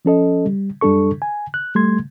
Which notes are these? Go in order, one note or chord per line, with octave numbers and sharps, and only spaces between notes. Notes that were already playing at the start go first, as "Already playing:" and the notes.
F3 C#4 A4 D#5
G3
F#2 G3 D4 A4 C#6
G#5
F#6
G3 A3 C6 G#6